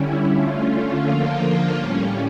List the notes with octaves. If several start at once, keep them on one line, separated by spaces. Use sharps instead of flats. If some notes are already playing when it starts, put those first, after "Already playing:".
Already playing: D3 G3 C#4 E4
D3 A3 C#4 F4
D3 F3 A#3
A2 G3 C#4